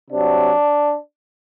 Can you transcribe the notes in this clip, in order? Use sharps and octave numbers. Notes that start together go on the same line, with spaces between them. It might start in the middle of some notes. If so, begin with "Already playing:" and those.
C3 F#3 D4